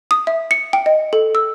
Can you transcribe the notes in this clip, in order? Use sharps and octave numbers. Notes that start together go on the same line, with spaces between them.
D#6
E5
C#7
G5
D#5
A4
E6